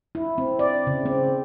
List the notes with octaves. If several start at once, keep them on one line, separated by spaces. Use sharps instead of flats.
E4
C4
D5
C#3
C4